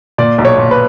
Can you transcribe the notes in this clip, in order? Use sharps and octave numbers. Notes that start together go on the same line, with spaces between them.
A#2 D5
B1
C#5
A#2
B4